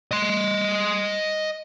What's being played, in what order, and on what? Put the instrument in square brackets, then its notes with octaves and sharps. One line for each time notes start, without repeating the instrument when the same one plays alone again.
[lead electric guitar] D#5 C6